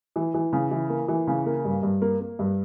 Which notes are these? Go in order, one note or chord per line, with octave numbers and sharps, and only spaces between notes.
E3
E3
C#3
E3
A#3
E3
C#3
A#3
G2
G2
A#3
A#3
G2